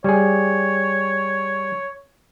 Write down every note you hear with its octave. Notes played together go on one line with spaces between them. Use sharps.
G3 G#4 C#5